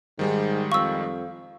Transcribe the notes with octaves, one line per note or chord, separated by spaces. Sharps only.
G#2 D#3 G3 G#3
F2 F5 C#6 E6